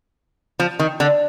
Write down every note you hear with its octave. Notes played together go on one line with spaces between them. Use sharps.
F3
D#3
D3